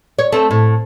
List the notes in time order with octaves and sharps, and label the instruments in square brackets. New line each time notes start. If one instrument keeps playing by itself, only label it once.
[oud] C#5
A3 C4
A2